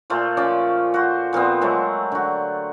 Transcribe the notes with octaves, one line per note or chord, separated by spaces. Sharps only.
A#2 A3 F4 C5
F3 C#4 D5
F#4 C5
A#2 F3 B3 C4
F#3 G#3 A3 C4
D3 F#4